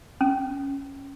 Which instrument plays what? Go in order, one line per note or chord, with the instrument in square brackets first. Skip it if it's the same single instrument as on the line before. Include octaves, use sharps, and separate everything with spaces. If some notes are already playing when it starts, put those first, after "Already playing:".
[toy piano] C#4